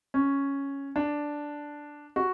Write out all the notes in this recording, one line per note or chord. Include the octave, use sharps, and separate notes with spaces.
C#4
D4
F#4